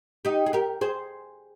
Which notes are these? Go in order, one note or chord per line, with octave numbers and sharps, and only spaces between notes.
D#4 G4
G#4
G4 A#4
G#4 C5